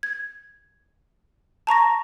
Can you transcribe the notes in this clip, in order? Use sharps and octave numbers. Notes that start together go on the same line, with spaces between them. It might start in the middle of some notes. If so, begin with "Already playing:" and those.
G#6
A5 A#5 C#6 A#6